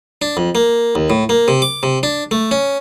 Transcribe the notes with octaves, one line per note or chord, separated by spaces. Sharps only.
D4
F2
A#3
D#2
A2
A#3
C3
D6
C3
D4
A3
C#4